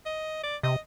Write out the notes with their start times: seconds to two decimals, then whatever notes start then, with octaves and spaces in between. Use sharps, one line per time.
0.06 D#5
0.43 D5
0.63 C3 D#5